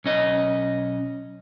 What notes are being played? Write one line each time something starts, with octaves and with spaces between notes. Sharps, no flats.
B1 C#4 D#5